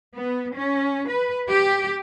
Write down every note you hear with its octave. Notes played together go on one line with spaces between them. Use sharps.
B3
C#4
B4
G4